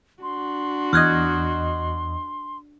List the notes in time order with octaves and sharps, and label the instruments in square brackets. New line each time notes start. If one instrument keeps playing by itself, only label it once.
[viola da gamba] D4 F#4 [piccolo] C6
[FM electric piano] E2 D#5 [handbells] F6 F#6 G#6